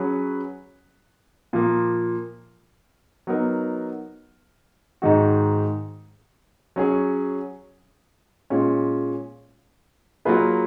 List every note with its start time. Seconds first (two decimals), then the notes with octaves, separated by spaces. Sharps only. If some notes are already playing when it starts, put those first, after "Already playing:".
Already playing: F#3 C#4 G#4 B4
1.53 A#2 F3 A#3
3.27 F#3 B3 D#4 A#4
5.02 G#2 D#3 G#3 D#4 F#4
6.76 F#3 C#4 G#4
8.50 A#2 G#3 C#4
10.25 F#3 A#3 F4 G#4 B4